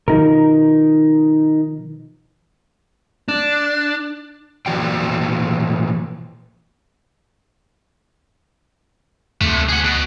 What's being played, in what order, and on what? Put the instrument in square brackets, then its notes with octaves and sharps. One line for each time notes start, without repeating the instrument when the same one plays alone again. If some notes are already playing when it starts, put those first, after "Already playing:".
[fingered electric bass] B2 D#3 F3 [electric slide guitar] D#4 A#4
[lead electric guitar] D4
[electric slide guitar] A#2 E3 F3 F#4 D5 G5
[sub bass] D2 [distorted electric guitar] C3 A3
[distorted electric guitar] G#4 F#5
B2